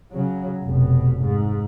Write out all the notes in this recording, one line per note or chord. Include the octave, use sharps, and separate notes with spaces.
C#3 F#3
F1 B2
G#2